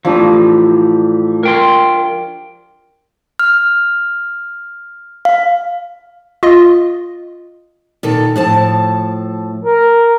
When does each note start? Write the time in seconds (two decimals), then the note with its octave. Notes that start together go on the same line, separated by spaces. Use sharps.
0.05 A2 E3 F3 D4 G4
1.43 A#4 G5 C6
3.39 F6
5.25 F5
6.43 F4 D#5
8.03 A#2 D#3 A4
8.36 A2 F3 A5
9.65 A#4